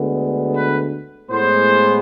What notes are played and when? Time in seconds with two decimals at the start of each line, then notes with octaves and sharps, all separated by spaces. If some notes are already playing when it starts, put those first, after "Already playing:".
Already playing: D2 D3 G#3 B3
0.55 B4
1.30 A2 G#3 B3 C5